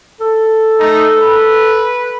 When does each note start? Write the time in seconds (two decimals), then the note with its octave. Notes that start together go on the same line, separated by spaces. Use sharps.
0.21 A4
0.80 A3 D#4
1.17 B4